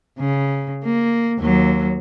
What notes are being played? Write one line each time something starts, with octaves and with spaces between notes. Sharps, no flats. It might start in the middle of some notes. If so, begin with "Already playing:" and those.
C#3
A#3
D#2 F#3